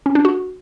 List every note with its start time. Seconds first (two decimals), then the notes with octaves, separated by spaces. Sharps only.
0.06 C#4
0.15 D4
0.25 F#4